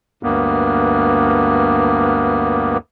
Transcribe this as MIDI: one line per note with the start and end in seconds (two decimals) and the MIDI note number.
0.23 2.77 38
0.23 2.77 43
0.23 2.77 58
0.23 2.77 59